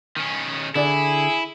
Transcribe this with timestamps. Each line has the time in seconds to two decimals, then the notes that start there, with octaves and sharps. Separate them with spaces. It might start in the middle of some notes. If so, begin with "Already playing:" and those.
0.17 D#3 C#4
0.75 D3 E4 G#4 D5